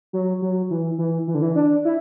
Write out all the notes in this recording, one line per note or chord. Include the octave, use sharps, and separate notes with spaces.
F#3
F#3
E3
E3
E3
D3
E3
D4
E4